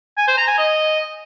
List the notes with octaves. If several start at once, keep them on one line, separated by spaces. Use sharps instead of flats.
G#5
C5
A#5
G#5
D#5